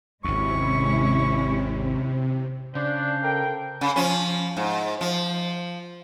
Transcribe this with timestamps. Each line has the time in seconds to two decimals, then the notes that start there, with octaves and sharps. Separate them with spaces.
0.24 G#1 D#2 C3 G#3 C#4 E4 C#6
2.75 C#3 D4 C5
3.22 A4 A#4 G5
3.81 C#3
3.96 F3 C#4
4.57 G#2
5.01 F3